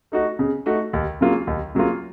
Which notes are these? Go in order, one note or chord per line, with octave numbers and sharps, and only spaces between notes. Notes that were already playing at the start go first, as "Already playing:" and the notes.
A3 D#4 F#4
C#3
A3 D#4 F#4
D#2
C#3 F#3 A#3 F4
D#2
C#3 F#3 A#3 F4